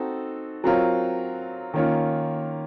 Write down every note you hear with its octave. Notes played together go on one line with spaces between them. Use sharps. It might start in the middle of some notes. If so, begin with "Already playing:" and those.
Already playing: C4 D#4 F#4 A4
F#3 C4 F4 A#4 C#5
D#3 A#3 C#4 F4